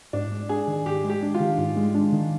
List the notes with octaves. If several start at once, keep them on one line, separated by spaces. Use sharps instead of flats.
G#2 D4
G#3
D4 G#4
D#3
G#2 G4
G#3
G4
D4
F4
D#3
G#2
G#3
D4
D#3